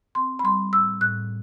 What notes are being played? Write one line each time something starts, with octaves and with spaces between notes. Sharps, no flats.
C4 C6
B5
G3 C6
A2 E6
A2 F#6